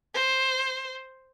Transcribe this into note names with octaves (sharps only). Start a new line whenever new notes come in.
C5